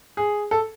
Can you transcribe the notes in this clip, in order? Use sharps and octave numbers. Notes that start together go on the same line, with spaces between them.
G#4
A4